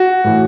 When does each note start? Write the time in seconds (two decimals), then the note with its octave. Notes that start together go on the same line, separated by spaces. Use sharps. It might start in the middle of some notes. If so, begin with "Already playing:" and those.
Already playing: F#4
0.24 A2 E3